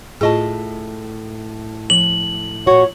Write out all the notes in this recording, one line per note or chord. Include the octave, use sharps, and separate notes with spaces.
A2 F4 G#4 D#5 A5
F3 F#7
A#2 F#4 C#5